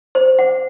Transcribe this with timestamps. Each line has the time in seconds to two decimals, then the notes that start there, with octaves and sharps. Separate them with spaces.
0.15 C5
0.39 F#5